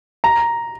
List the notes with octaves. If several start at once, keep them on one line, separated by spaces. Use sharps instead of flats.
A#5